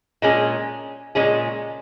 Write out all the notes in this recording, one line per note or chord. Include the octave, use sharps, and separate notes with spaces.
A#2 G#3 C#4 G#4
A#2 G#3 C#4 G#4